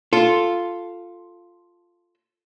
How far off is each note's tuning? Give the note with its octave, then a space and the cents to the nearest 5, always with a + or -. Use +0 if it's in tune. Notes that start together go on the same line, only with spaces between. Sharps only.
F4 +0 A4 +0